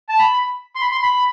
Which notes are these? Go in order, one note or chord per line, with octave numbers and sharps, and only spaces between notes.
A5
B5
C6
B5
C6
B5